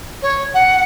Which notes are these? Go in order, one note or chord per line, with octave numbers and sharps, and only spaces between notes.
C#5
F#5